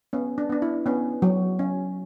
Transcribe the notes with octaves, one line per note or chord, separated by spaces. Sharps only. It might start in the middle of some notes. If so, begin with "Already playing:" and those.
B3 C#4
D4
B3 D4
E4
B3 C#4
F#3
C#4